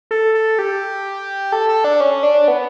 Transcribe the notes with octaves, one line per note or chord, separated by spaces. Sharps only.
A4
A4
G4
A4
A4
D4
C#4
D4
B3